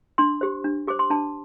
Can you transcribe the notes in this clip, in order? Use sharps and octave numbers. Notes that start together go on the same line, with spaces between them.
D4 C6
G4 C5
D4
G4 C5 D6
C6
D4 A5